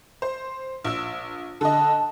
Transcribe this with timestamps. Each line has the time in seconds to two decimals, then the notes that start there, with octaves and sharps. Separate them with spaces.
0.22 C5
0.84 A#1 E6
1.61 D3 D#5 A5